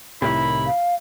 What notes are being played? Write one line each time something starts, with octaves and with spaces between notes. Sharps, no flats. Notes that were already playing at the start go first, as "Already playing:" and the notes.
C2 A2 C3 D#3 E4 B5
F5